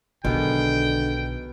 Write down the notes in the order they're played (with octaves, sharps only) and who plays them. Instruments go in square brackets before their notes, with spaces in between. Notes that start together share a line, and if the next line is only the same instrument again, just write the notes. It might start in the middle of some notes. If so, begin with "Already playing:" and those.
[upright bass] B1 [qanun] B2 D#3 G#3 [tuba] D3 [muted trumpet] G5